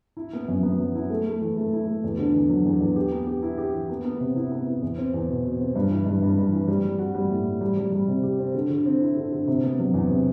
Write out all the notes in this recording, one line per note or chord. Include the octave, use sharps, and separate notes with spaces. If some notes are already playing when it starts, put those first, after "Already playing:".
E4
B3
F#2
B3
F#3
E4
A3
A3
E3
A3
E4
A3
E2
D3
E2
F#3
E2
E2
G4
B3
G4
E4
G4
E3
B3
B3
C3
E4
B3
E4
E2
C4
E2
B2
B2
C4
G2
E3
G2
G2
G2
E3
G3
G3
F#4
G3
A2
A2
G3
G3
G3
C3
G4
C4
D3
D3
C4
E4
D3
D3
C3
B3
F#3
E2
C3